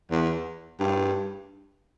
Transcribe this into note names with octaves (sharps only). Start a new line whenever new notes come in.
E2
G2